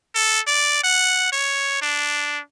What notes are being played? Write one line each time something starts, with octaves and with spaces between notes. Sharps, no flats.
A4
D5
F#5
C#5
D4